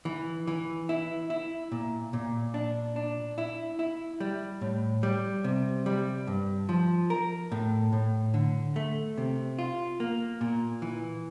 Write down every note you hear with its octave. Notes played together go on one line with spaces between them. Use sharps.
E3
E3
E4
E4
A#2
A#2
D4
D4
E4
E4
G3
A2
G3
C3
G3
G2
F3
A#4
A2
A2
D3
A3
C3
F4
A#3
A#2
E3